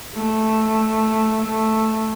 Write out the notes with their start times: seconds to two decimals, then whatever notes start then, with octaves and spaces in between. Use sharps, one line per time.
0.15 A3
1.41 A3